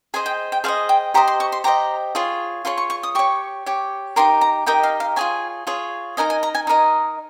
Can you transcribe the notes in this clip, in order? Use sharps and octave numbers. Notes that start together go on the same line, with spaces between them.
G#4 C5 D#5 G#5
G5
G5
G#4 C5 D#5 F5
G5
G4 C5 D#5 A#5
C6
C#6
C6
G4 C5 D#5 A#5
F4 G#4 C#5
F4 G#4 C#5 C6
C#6
C#6
D#6
G4 C#5 C#6
G4 C#5
D#4 G4 A#4 C6
A#5
D#4 G4 A#4 D#5 G5
F5
F5
F4 G#4 C#5 G#5
F4 G#4 C#5
D#4 A#4 D#5 G#5
G#5
A#5
G#5
D#4 A#4 D#5